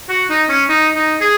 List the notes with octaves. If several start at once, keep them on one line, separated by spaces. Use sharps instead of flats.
F#4
D#4
C#4
D#4
D#4
G#4